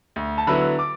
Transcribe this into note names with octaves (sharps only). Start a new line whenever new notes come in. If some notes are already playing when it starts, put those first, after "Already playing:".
D2
A5
D3 F#3 B3 E4 B5
D6